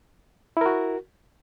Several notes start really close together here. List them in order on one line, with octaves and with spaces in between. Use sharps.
E4 A#4 F#4